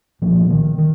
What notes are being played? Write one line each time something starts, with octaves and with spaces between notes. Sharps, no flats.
C2 A#2 F3
D#3
D#3